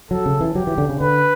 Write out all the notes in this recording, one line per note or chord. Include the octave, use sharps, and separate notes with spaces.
F#3 A4
C#3
E3
F#3 G4
E3
D3
C#3
D3 B4